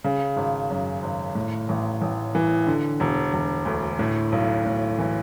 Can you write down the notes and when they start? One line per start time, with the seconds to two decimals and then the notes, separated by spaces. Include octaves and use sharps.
0.04 C#3
0.36 G#1
0.70 F#2
1.02 G#1
1.35 A2
1.69 A1
2.02 A1
2.35 E3
2.67 D3
3.00 E1
3.33 E1
3.65 D2
3.99 A2
4.32 B1
4.66 A2
4.98 E3